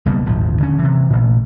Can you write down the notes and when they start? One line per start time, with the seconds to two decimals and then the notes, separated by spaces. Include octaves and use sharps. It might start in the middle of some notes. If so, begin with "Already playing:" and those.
0.06 F#1 B2 G3 A#3
0.26 D#1 G#1 A2 F3
0.60 D3 C#4
0.79 C3 E3
1.10 A1 A#2